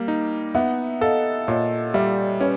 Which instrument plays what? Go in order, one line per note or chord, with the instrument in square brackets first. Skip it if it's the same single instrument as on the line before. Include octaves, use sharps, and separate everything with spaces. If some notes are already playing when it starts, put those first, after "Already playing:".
Already playing: [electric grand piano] G3 A#3
D#4
[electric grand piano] B3 [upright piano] E5 F#5
[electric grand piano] A4 [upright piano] D#5 F5
[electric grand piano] A#2 [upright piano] C#5 D#5
[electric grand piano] G3 [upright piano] D5 E5
[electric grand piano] C#4 [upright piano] B4 C#5